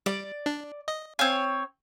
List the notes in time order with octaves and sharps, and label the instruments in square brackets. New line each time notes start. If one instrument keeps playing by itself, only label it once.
[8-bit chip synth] G3 [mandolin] D5
[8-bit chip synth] D4
D#5
[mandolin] C4 C#5 [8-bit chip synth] F5 G#5